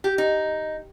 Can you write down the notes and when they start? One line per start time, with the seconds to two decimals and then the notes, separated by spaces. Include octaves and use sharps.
0.04 G4
0.18 D#4